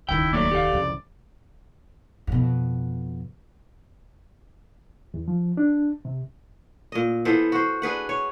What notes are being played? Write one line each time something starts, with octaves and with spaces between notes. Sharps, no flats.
D#1 C#2 D#3 E4 G5
F#3 A3 A#3 D5
G4 A4 F5
C2 F2 C#3
F2 B2
E2
F3
D4
C3
A#2 D#5
E3 B3 A4 C5
F#4 C5
D4 G#4 B4 F#5
C#5